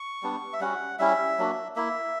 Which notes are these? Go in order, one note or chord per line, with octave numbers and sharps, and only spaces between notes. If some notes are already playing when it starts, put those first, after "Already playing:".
Already playing: C#6
G3 B3 D4
E5
G3 C#4 F#4 F#5
G3 C#4 E4 E5
F#3 A#3 D4 F#4
A#3 E4 E5